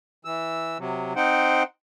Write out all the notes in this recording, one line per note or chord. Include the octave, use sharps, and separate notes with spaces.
E3 E6
C3 F#3
C4 D#4 C5 F#5 G5